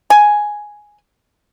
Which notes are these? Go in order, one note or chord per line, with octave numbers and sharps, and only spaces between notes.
G#5